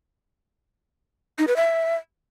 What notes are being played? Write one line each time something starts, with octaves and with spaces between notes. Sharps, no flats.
D#4
B4
E5